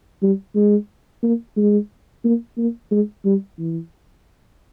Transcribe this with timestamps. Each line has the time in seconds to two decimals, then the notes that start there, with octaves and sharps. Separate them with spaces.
0.22 G3
0.55 G#3
1.23 A#3
1.57 G#3
2.24 A#3
2.57 A#3
2.91 G#3
3.25 G3
3.58 E3